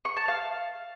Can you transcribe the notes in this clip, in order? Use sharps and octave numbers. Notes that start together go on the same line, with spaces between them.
C#6
A5
F5